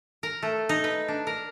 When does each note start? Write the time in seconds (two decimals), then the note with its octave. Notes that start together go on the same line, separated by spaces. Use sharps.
0.23 A#4
0.42 A3
0.69 D#4
0.84 B4
1.08 D4
1.27 A#4